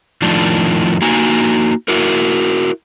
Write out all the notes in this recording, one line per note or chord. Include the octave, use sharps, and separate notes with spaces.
F2 A2 D#3 F3 D4
A#3 D#4 F#4 G#5
E4 F#4 A#4